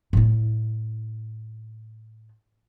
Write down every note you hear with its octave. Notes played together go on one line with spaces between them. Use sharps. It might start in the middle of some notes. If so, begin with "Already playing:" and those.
A2 E4